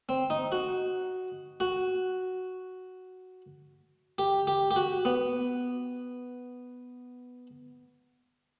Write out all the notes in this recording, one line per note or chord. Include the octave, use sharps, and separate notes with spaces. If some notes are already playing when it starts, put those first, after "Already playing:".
C4
D#4
F#4
F#4
G4
G4
G4
F#4
B3